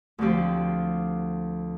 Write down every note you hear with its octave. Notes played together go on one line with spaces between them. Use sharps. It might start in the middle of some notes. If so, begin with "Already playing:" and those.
D2 D3 F3 C4 G4